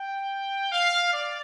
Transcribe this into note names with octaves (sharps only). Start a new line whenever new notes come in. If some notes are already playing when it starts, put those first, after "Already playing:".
Already playing: G5
F5
D5